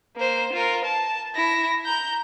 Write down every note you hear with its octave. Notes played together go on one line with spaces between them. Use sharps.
A#3 C5
F4 A#4
A5
E4 A#6
A#5 G6